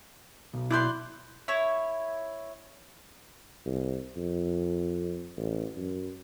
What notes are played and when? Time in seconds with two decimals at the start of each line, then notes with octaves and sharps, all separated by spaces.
0.53 B1
0.70 E4 D5 C6 F#6 G6
1.48 E4 C#5
3.66 C2
4.17 F2
5.37 A1
5.77 F#2